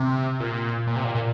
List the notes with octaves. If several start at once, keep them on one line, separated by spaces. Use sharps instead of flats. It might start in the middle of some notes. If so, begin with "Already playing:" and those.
Already playing: C3
A#2
A#2
C3
A#2
A#2